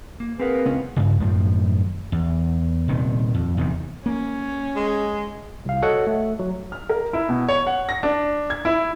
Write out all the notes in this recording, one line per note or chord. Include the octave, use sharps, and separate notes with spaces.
A#3
C4 G#4 A#4 B4 F5 F#5
C#2 B3 C#4
G2 C#3
F#2 A2 D#3 F3
E2
D#1 C3 D#3
F2
E2 C3 D#3
A#3 C#4
G#3
C2 F5
F#4 A4 C#5 D#5 F#5
A3
F#3
F6
A#4
E4
B2
C#5
F#5
A#6
D4
G#6
E4